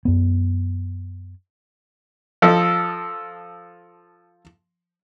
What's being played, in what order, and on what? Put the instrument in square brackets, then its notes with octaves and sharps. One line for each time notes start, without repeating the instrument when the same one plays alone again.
[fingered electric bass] F#2 B3
[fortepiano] F3 A4 D#5